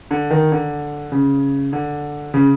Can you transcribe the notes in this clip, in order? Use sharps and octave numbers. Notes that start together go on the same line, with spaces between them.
D3
D#3
D3
C#3
D3
C#3